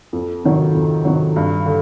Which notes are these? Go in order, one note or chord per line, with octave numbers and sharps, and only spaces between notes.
F2
C3 D#3 F#3
F2
C3 D#3 F#3
G2
D3